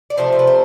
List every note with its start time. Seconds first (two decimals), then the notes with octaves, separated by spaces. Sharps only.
0.10 D5
0.17 C3 F3 A3 C5
0.32 C5
0.39 B4
0.47 C5